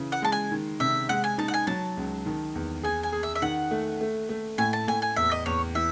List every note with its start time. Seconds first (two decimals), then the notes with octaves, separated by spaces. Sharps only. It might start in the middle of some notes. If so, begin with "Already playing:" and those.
Already playing: C#3 E3
0.12 F#5
0.22 G#3 A5
0.32 G#5
0.52 D#3
0.80 C3 E5
1.09 G#3 F#5
1.24 G#5
1.38 D#4 A5
1.48 F#5
1.54 G#5
1.67 F#3 A5
1.97 C#2
2.26 D#3
2.55 E2
2.83 G#4 G#5
3.03 G#5
3.12 G#4
3.23 E5
3.35 E5
3.42 D#3 F#5
3.71 A3
4.01 A3
4.29 A3
4.58 A2 G#5
4.73 A5
4.88 A2 G#5
5.02 G#5
5.16 E2 E5
5.32 D#5
5.46 E2 C#5
5.75 E3 E5